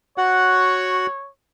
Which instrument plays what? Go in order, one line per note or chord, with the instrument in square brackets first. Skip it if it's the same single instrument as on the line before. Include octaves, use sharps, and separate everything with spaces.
[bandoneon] F#4 F#5 [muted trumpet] C#5